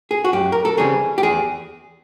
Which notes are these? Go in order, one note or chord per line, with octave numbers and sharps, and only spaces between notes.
G#4
F#4
F#2 G4
A#4
A4
C#3 E3 G3 C4 G#4
G4
E2 G#4